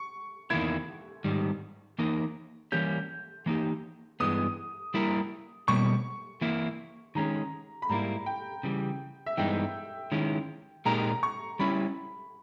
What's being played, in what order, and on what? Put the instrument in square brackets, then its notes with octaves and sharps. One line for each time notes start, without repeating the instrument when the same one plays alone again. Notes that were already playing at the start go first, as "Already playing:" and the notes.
Already playing: [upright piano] C#6
[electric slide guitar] E2 D#3 A#3 E4 [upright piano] G#6
[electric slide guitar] G#2 D#3 G3
E3 A#3 D#4 A#4
[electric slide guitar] E3 G3 A#3 C#4 G4 [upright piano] G6
[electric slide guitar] E3 A#3 D#4 G4
[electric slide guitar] G2 E3 G#3 B3 [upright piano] D#6
[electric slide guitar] G3 A#3 E4 A#4
[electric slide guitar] B2 G3 A#3 [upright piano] C#6
[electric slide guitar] E3 A#3 E4
[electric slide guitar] D#3 G#3 C#4 [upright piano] A#5
[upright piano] B5
[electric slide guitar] G#2 G3 A#3 E4 [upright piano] A#5
[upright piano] G5
[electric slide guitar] C#3 E3 G3
[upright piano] E5
[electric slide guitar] G2 E3 G#3 B3 D#4 [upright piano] G5
[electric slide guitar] D#3 G#3 C#4 E4
[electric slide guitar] A#2 G#3 D#4 G4 A#4 [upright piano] A#5
[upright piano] C#6
[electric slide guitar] G3 C#4 E4 [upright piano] B5